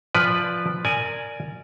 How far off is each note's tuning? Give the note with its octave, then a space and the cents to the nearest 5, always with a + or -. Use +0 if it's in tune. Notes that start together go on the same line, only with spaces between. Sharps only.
F3 +0 B4 +0 D5 +0
A#4 -20 D5 +0 G#5 +0